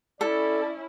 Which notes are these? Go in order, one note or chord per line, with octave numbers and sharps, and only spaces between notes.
C#4 E4 A4 D5